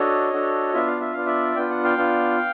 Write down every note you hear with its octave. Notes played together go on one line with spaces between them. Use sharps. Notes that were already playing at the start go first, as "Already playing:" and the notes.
Already playing: D4 F#4 A4 C#5 D#5
D4 F#4 A4
B3 D4 F4 E5
F5
E5
B3 D4 F4 F5
D5 E5
B3 D4 F4 G5
F#5
F5 G5
B3 D4 F4